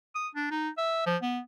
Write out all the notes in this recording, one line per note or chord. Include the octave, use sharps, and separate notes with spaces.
D#6
D4
D#4
E5
F3
B3